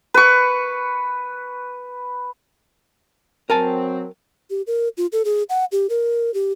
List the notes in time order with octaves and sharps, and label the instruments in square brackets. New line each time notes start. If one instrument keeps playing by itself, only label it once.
[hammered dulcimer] B4 C#6
[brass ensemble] F#3 C4 [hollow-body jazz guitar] A#4 G#5 A5
[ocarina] G4
A#4
F4
A4
G#4
F#5
G4
A#4
G4